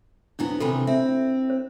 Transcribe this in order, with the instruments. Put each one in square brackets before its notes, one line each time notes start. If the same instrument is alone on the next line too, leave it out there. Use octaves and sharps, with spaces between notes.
[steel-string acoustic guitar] F2 F#3 B3 [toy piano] D4 E4
[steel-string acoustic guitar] C3 D#3 E3 [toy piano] A4 B5
[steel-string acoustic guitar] C4 [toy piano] E5
[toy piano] C5